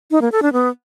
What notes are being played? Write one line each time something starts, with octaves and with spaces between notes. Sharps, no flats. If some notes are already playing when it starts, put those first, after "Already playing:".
D#4
A#3
A4
D4
B3